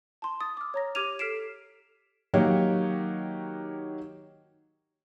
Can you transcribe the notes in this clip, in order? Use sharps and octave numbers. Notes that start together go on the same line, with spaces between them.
A5 C6
D#6 A6
D6 F6
C#5 A#5 A#6
G4 D6 F6 G#6 D#7 F7
A4 F6 B6 C7 D7 E7
D#3 F#3 A#3 D#4 G4 C#5